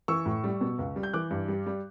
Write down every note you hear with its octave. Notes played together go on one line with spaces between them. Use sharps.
E3 C#6 E6
A2
G3
B2
C#2
G3
G6
E3 D6 F#6
G2
G3
G3